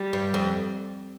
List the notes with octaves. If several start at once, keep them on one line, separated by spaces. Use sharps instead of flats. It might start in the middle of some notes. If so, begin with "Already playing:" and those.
Already playing: G3
G2
F2